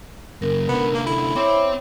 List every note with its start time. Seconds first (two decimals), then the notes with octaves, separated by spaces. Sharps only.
0.42 F#2 C#3 A#4
0.69 C2 D3 B3
0.94 A#3
1.07 E4 A4
1.36 C4 C5 C#5 E5 D6